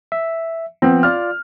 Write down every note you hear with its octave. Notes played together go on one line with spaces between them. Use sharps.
E5
F3 B3 C4
F4 D5 F6